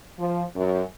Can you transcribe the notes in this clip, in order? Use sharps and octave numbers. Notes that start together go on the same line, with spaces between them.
F3
F#2